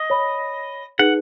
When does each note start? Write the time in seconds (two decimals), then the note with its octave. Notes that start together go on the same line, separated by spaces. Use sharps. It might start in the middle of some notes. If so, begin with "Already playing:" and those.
Already playing: D#5
0.10 C#5 B5
0.99 D#4 G#4 B4 F#5